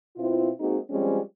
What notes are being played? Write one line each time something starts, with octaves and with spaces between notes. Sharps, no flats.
B2 C4 E4 F4
G#3 A#3 C4 D#4 F#4 G#4
F3 G3 G#3 C4 C#4